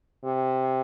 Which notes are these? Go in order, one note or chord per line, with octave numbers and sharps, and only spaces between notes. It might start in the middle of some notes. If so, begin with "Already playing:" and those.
C3